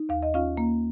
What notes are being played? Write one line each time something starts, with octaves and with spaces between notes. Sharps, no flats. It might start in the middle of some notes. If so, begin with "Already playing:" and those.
Already playing: D#4
D#2 F5
D#5
C#4 F4 F5
A#3